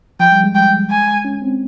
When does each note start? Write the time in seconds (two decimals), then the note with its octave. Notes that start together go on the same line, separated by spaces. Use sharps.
0.20 F3 G5
0.32 G3
0.44 G#3
0.55 G5
0.90 G#5
1.25 C#4
1.42 C4